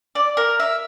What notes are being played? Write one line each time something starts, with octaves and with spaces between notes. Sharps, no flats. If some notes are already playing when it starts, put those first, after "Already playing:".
D5
A#4
E5